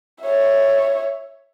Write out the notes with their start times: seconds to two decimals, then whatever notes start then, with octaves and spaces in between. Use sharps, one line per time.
0.23 C#5 E5